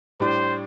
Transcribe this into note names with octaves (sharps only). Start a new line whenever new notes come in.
A2 G3 D4 C5